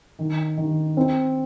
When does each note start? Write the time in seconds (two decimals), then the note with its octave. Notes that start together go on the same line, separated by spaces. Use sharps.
0.19 D#3
0.57 D#3
0.97 C4